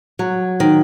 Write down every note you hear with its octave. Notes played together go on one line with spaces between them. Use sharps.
F#3
D#3